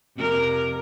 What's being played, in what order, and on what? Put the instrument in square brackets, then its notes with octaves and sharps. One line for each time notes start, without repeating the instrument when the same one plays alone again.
[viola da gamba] F2 C3 A#4